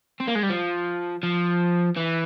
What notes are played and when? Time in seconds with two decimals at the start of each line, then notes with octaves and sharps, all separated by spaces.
0.20 C4
0.27 A#3
0.35 G#3
0.43 G3
0.50 F3
1.23 F3
1.96 E3